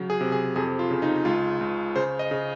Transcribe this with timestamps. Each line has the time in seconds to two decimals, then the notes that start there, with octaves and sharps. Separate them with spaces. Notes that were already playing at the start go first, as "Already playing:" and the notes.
Already playing: C#3 F#3
0.10 G#4
0.21 C3
0.32 G#4
0.56 F2 G#4
0.79 F4
0.91 C#3
1.02 D#4
1.25 C#2 F4
1.61 C#2
1.96 C#3 C5
2.19 D#5
2.31 C#3